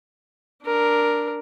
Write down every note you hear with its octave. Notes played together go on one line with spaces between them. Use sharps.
D4 A#4